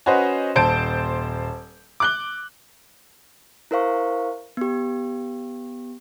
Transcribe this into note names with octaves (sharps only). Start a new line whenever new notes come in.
C#4 F#4 B4 C5 D#5
D#1 C5 A5 G6 D7
D6 F#6 G7
E4 A#4 C5 F5 C#6
B3 G4